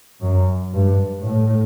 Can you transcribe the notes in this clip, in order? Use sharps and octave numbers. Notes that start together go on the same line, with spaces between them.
F#2
G2
A2